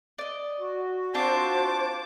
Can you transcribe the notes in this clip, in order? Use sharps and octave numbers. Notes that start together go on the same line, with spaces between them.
D5 D#5
F#4
C4 D4 F4 C5 A5 D6